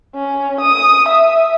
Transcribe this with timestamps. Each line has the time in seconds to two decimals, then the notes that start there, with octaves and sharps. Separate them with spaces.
0.15 C#4
0.60 D#6
1.08 E5